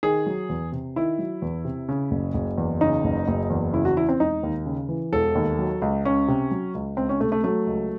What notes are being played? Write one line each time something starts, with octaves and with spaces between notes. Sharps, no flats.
D#3 G#4
F#3
E2
C3
D#3 E4
F#3
E2
C3
C#3
F#1
F#1
E2
C#3 D#4
F#1
F#1
E2
C#3 E4
F#4
E3 E4
C4
E1 D#4
D#2
C#3
E3
E1 A4
D#2
F#3
C#2
C#2 C#4
C3
F#3
C#2
C#2 C4
C#4
C3 A3
A3
F#3 A3
C#2